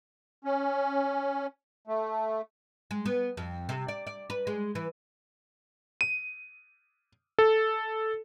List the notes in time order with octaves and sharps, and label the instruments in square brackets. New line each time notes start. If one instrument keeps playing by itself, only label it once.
[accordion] C#4
A3
[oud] G#3
B3
F2
C3
D5
D5
B4
G#3
E3
[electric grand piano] D#7
A4